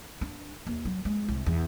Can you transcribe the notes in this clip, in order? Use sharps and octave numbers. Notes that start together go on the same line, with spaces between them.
D4
D#2
F#3
G#3
C2
E2